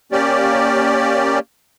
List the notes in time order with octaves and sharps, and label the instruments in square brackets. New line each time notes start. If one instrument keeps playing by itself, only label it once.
[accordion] A#3 C#4 G4 D5